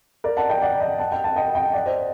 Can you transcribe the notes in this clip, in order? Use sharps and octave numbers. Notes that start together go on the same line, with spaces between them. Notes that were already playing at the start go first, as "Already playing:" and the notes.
A#4 D5
F#5 A5
D#5 G5
D5 F#5
D#5 G5
F#5 A5
D#5 G5
F#5 A5
D#5 G5
D#5 G5
D5 F#5
C5 D#5